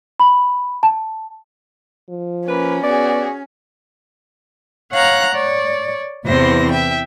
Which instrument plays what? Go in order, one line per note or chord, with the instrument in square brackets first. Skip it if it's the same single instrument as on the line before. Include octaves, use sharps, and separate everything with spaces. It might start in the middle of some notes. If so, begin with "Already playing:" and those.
[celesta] B5
A5
[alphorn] F3
[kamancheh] A#3 B5 [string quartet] C#4 [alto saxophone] B4
[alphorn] B3 [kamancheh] F#4 G#4 [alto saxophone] D5
[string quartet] C#5 F5 F#5 A#5 F#6
C#5 D5
E2 C3 E3 C4 C5 A#6
E5 G5